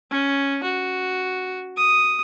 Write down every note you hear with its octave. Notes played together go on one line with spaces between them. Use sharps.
C#4
F#4
D#6